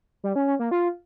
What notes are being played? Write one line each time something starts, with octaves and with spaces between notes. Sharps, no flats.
G3
C#4
C#4
A#3
F4